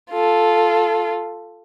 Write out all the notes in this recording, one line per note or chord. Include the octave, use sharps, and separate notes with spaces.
F4 A4